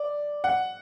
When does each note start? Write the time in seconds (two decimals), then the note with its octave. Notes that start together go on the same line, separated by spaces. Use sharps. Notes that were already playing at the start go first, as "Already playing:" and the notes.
Already playing: D5
0.44 F#5